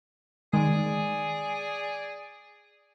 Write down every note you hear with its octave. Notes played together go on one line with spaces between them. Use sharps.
D#3 G#3 G#4 D5